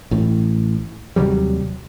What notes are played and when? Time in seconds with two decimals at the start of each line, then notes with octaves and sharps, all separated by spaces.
0.11 A1 A2
1.16 D#2 C3 F#3 G3